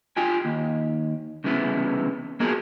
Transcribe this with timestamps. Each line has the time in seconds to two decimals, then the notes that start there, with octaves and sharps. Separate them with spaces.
0.17 F4 G5 G#5
0.45 D#2
1.44 C2 C#3 E3 B3
2.40 A#3 B3 F4 F#4 G#4 A#4